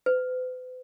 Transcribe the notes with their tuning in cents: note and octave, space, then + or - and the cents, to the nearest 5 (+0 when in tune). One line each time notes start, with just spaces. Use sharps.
B4 +45